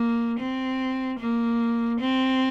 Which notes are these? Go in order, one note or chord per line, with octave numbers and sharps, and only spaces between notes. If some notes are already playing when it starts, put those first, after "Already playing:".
Already playing: A#3
C4
A#3
C4